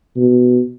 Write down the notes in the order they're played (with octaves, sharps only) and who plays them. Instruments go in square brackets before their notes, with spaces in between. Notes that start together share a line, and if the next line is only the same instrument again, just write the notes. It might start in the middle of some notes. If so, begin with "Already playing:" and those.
[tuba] B2